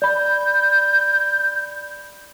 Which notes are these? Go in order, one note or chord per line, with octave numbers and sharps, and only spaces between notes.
D5 B5 G6